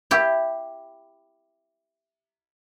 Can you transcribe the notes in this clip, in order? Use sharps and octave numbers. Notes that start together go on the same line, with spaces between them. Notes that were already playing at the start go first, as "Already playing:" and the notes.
E4 G4